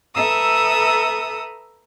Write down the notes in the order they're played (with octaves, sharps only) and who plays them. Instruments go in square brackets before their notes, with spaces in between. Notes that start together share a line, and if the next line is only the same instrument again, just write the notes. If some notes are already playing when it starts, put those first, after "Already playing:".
[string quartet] A4 B4 E5 A#5 D#6 E6